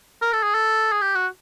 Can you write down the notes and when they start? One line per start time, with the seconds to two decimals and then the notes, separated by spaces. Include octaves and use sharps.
0.22 A#4
0.33 A4
0.43 G#4
0.54 A4
0.92 G#4
1.01 G4
1.15 F#4